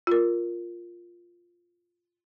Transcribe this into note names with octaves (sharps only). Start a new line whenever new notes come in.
F4 A#4